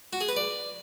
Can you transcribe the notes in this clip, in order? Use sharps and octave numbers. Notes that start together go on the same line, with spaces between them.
F#4
G#4
B4
D5